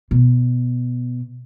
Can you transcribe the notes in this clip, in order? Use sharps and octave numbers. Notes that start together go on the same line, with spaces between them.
B2